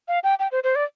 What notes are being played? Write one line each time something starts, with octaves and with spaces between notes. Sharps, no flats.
F5
G5
G5
C5
C5
D5